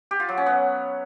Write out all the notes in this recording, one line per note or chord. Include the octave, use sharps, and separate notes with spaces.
G4
F4
F#3
C#4
B3